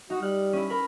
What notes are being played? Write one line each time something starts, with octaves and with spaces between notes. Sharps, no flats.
D#4 F#4
G3 F6 F#6
C#4 E4
A#4 B5